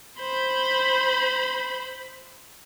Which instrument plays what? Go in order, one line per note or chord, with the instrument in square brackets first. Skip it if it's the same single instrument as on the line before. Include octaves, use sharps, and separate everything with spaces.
[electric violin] C5 B5